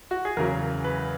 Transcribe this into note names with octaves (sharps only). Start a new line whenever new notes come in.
F#4
G#4
E2 C#3 F#3 A#4
B4